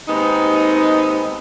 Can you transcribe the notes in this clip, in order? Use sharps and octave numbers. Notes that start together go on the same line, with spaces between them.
D#2 G#3 B3 C4 D#4